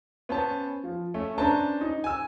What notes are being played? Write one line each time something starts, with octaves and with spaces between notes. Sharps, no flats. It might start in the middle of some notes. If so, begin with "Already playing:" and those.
B3 C#4 C5 A5
F3
A3 C#4
C#4 D4 B4 C5 A5 A#5
D#4
G#5 E6